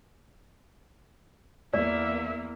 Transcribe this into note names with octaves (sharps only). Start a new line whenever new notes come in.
E2 A#3 D5 E5